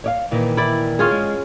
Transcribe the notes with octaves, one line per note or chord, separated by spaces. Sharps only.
C#5 D5 F5
A#2 D#3 E3
E4 D5
C#4 F4 G#4
G#3